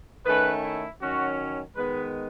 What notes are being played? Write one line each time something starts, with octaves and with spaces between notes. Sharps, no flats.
D#3 A3 C#4 B4
E4
D#3 F#3 C#4 F#4
D#3 G#3 B3 B4